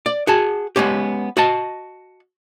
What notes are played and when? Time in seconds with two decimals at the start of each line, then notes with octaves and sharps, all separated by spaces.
0.06 D5
0.27 F#4 G#4 A5
0.76 G#3 B3 C#4 G4
1.37 F#4 D#5 A5